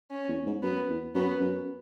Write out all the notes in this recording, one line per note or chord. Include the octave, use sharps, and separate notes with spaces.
C#4
E2
G#2
F#2 B3
E2
F#2 B3
F#2